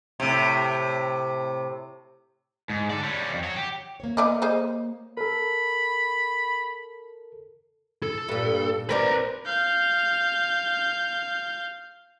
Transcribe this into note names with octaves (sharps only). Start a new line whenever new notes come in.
A2 C3
G#2
A4 D5
G3 C#4
F2
F#4 C#5
G4
A#3 C#5
B3 D5 D#5
G#4 C5 D#5
A4 A#4 B5
A4
G2 A#2
C4 A#4 B4 D5 A#5
F5 G6